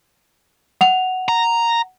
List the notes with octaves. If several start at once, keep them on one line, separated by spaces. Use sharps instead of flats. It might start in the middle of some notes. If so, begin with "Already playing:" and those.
F#5 F7
A#5